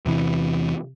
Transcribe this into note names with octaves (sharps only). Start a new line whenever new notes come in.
E2 C3 E3